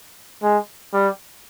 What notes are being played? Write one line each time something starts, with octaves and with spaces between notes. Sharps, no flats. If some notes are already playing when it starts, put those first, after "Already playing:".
G#3
G3